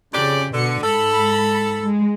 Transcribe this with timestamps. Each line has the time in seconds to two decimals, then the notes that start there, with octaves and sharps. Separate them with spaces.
0.13 F2 C#3 G4 D5
0.53 B2 D3 C#7
0.83 G#2 A4 B5
1.81 G#3